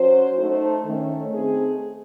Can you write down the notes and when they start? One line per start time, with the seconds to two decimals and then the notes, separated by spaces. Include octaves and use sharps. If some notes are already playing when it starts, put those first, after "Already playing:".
Already playing: F#3 C#4 F#4 C5
0.38 A3 D#4 A4 C5
0.85 D#3 A3 C#4
1.33 A3 C4 D#4 G#4